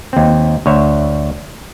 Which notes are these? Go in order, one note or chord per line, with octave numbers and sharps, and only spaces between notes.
D#2 C4
D2 C#5 E5